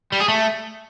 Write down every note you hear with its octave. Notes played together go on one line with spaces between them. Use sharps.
G3
G#4
A3